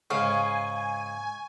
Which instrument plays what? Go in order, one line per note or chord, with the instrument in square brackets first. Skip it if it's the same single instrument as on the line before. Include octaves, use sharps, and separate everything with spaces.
[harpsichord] G#2 C#3 [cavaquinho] F5 [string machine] G#5 [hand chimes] C#6